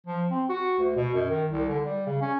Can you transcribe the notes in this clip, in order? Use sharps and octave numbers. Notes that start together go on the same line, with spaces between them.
F3
C4
F#4
D2
B2
F#2
D#3
C2
D3
G3
C#3
C#4